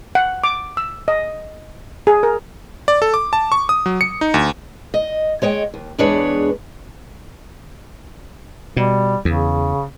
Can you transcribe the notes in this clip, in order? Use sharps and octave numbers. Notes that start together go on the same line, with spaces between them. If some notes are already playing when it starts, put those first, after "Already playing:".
F#5
D6
E6
D#5
G#4
A#4
D5
A4
D6
A5
C#6
D#6
F#3
C#7
D#4
D2
D#5
G#3 C#5 D#5 G5
D#2
E2 G#3 D4 G#4 B4 C#5
B2 G3
E2 C#3